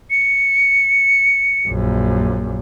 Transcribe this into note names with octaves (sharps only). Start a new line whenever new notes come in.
C#7
A#1 F#2